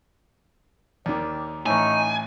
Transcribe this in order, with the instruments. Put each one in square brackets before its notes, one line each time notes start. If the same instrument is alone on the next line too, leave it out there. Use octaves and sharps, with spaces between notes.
[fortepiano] D#2 D#3 [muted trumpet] D5
[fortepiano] A1 A2 [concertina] D#4 [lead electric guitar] G#5 [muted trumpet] C#6